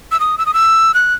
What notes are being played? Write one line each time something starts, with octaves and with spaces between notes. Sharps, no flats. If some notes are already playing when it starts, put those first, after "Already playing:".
E6
D#6
E6
D#6
E6
F#6